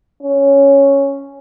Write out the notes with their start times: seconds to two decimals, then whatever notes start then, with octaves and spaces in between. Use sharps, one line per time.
0.23 C#4